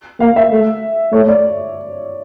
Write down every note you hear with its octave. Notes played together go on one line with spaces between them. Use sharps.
A#3 F5
E5
A3
A3 C#5
D5